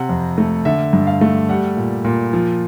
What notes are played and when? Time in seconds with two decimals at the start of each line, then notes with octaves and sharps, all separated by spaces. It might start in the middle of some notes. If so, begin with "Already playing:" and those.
Already playing: C3 F#5
0.09 F2
0.38 A3
0.65 D3 E5
0.93 G2
1.07 F5
1.21 A3
1.49 G3 F#5
1.77 A#2
2.05 A#2
2.33 F3